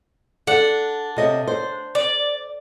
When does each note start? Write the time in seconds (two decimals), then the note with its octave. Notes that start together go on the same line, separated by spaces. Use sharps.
0.47 D4 A4 F#5
1.16 C3 D#5 E5
1.47 C5
1.95 D5